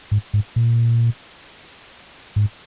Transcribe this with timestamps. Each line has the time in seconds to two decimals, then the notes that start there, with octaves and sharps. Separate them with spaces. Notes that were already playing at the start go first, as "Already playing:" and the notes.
0.11 G#2
0.34 G#2
0.56 A#2
2.36 G#2